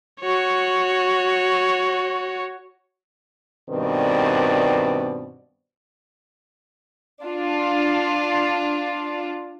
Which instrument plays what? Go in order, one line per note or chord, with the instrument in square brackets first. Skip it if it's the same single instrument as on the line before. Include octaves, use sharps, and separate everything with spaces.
[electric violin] F#4 C#5
[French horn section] G2 B2 D#3 C4 B4 D5
[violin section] D4 F4